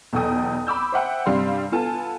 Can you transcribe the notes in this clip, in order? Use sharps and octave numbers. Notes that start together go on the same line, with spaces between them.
B1 E2 B2 A4 G5 D#6
B5 D6 E6 G6
C5 E5 F#5 G5
G2 C3 G3 F5 C6
B3 F4 A4 G#5 A5